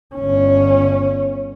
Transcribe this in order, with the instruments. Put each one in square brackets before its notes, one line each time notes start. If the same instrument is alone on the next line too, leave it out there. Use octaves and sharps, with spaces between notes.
[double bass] G1 C#4